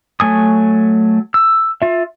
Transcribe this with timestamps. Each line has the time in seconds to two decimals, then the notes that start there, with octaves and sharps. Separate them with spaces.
0.20 F#3 A3 G#5 D#6
1.34 E6
1.82 F4 E5